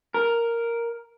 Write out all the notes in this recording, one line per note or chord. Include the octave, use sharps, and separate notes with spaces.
A#4